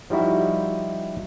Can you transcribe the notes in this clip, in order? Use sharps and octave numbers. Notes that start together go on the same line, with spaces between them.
F3 G3 D#4 E4 F#4